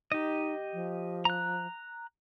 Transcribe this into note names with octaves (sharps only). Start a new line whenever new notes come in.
D#4 G4 D#5
F3
A#5 F#6